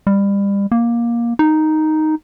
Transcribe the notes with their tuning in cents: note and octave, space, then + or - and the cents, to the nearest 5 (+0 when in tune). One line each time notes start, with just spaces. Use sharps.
G3 +30
A#3 +15
D#4 +0